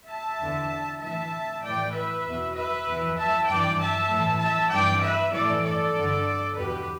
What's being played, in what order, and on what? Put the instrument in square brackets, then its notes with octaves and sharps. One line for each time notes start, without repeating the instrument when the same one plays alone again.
[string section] E5 A5
E2 D3
A2 E3 E5 A5
A2 E3 D5 G5
B4 E5
E2 B2
B4 E5
E2 E3
E5 A5
G2 E3 D5 G5
E5 A5
A2 E3
E5 A5
G2 E3 D5 G5
B4 E5
A2 E3 A4 D5
A4 D5
G2 D3
E2 B2 G4 B4